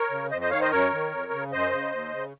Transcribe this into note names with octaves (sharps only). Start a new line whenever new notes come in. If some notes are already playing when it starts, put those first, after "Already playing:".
Already playing: A#4 C#5
C#3
F2 C5 D#5
C5 D#5
D#3 C#5 F5
C5 D#5
F#2 A#4 C#5
D#3
F2
C#3
F#2 C5 D#5
C#3
D#2
C#3